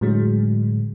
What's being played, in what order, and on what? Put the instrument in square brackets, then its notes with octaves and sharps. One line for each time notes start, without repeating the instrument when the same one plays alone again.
[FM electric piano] A2 D3 F#3 G#3